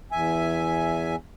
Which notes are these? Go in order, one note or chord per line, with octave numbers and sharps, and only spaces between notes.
E2 E5 G#5